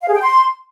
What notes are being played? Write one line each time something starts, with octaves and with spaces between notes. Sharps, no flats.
F5
G#4
G5
C6